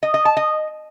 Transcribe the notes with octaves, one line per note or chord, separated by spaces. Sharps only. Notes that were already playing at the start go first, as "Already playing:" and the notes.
D#5
D#5
A5
D#5